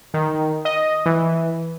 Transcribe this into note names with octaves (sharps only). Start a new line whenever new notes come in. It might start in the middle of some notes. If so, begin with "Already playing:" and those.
D#3
D#5
E3